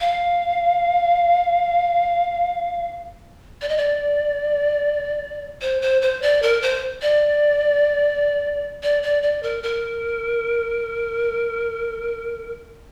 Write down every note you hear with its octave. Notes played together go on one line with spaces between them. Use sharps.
F5
D5
D#5
D5
C5
C5
C5
D5
A#4
C5
D5
D5
D5
D5
A#4
A#4